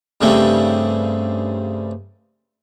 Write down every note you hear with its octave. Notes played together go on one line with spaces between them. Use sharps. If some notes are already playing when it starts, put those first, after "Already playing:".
G2 C#3 G3 A3 C4